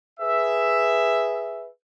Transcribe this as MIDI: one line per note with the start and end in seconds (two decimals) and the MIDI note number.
0.19 1.68 68
0.19 1.68 71
0.19 1.68 76